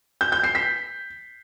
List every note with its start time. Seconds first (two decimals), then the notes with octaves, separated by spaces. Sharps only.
0.21 G6
0.32 G6
0.44 C7
0.55 B6